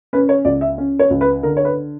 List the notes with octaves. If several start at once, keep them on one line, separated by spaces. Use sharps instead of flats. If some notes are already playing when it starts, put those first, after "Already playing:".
C#4 B4
C#5
C#2 D5
E5
C#4
C#5
C#2
B4
D3 A#4
C#5
B4